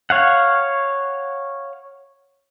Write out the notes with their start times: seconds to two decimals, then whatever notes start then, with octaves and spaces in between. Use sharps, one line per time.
0.10 C#5 F5 F#5